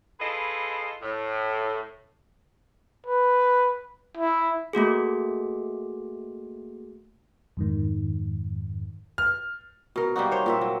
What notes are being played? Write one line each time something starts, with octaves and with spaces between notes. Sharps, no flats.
E4 F4 G#4 A4 B4 D#5
A2
B4
E4
A3 A#3 F#4 G#4
F2 G#2 D#3
F6
B2 A#4
G3 A#3 D#4 F#4
C5 C#5
A#2 C4 E5
F#3